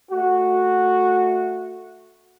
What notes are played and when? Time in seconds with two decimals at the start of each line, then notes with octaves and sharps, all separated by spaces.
0.11 A3 F#4